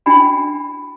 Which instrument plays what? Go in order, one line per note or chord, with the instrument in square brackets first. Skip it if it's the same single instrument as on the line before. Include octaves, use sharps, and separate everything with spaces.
[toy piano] D4 E4 F#4 G5 G#5 B5